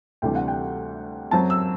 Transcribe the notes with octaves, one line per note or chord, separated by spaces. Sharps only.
D2 C3 E3 G3 D4 G5
F#5
G5
F#2 F#3 C4 A5
E6